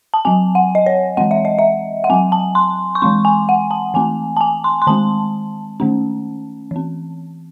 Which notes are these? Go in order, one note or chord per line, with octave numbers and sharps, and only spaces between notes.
A5
F#3 C4 G#5
F#5
D#5
C#5
E3 G#3 C4 F#5
E5
D#5
E5
F#5
F#3 C4 G#5
A5
C6
C#6
E3 G#3 C4 C6
G#5
F#5
A5
E3 A3 C4 G#5
A5
G#5
C6
C6
D#3 G#3 C4 A5
D#3 A3 C#4
E3 C4